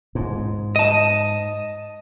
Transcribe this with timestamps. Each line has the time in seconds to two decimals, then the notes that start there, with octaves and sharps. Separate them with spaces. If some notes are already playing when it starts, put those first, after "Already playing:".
0.15 G#2
0.76 D#5 A5